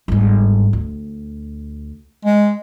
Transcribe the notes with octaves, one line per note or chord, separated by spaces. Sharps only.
G1 G#2
D2
G#3